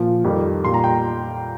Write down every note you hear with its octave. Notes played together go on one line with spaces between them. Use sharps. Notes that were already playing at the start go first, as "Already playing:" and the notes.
Already playing: A#2 F3
F2 D#3 G3
A#2 G3 C6
A#5
G5